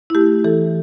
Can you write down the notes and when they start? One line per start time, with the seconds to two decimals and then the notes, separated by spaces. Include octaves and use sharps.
0.10 E4
0.15 A3 G4
0.44 E3 A4